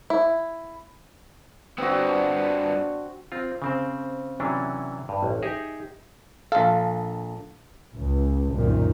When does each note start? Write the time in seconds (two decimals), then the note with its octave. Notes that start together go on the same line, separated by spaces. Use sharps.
0.10 E4
1.78 G2 B3 C4 D4 F#4
3.32 C4 F4
3.62 C#3 C4 C5
4.40 C3 E3 F#3 C#4 D4
5.09 G2
5.23 A1
5.43 D#4 G4 G#4 E5
6.52 A#1 A4 F5
7.94 C#2
8.55 C2 F#2 A#2 D#3